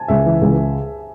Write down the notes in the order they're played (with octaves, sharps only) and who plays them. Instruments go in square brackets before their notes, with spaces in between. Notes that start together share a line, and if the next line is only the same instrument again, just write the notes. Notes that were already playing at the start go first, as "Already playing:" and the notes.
Already playing: [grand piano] G#5 A5
[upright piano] C#2 [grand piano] E5
[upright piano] E3
C#2